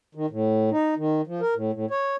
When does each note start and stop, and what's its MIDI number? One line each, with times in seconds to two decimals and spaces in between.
0.15 0.26 51
0.30 0.70 45
0.71 0.94 63
0.97 1.21 51
1.27 1.41 53
1.41 1.54 70
1.55 1.72 45
1.73 1.86 45
1.91 2.16 73